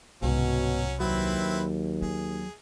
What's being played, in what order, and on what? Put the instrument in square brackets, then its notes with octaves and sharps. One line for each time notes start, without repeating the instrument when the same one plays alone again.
[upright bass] C2 [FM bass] G#2 [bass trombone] B2 [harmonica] F#3 C#4
[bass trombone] D#2 [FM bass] F#3 [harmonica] C4 E4 B4
[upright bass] A#3 [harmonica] G#4